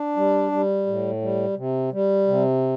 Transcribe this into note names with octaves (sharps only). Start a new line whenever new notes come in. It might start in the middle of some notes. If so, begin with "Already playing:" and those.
Already playing: D4
G3
G3
A2
G3
C3
G3
C3